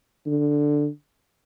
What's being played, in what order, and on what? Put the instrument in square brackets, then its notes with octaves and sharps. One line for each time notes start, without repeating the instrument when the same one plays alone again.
[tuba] D3